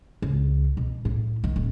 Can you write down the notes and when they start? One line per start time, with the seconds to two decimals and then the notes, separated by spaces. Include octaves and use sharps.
0.22 C#2
0.77 B2
1.05 A2
1.44 D#3
1.56 D#1